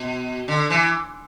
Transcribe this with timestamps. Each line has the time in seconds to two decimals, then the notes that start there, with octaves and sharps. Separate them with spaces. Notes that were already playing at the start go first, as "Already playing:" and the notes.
Already playing: B2
0.48 D3
0.70 E3